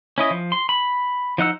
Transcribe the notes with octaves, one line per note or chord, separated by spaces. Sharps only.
C#4 E4 D#5
F3
C6
B5
F3 D#4 F#5 E6